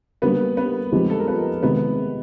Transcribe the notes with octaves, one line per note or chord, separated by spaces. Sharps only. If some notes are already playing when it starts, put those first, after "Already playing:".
D3 G3 A#3 B3 B4
B3 B4
F3 G#3 C4 D#4 G4
A4
A#4
B3 B4
C3 D#3 G#3 B3 B4